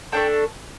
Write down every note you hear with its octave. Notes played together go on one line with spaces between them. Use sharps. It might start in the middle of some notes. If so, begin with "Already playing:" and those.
A3 D4 A4 G5